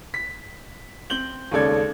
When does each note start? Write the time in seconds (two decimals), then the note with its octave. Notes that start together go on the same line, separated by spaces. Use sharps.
0.14 B6
1.10 C4 G6 F#7 G7
1.51 D#2 C#3 G#3 A4 D5 G#6